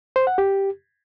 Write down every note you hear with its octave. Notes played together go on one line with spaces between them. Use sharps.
C5
F#5
G4